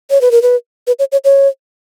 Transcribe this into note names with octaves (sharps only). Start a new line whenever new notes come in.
C#5
B4
A#4
B4
B4
C#5
C#5
C#5